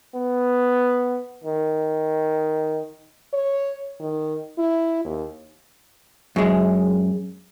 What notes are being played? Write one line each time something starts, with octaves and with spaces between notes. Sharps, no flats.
B3
D#3
C#5
D#3
E4
D#2
F#2 G#3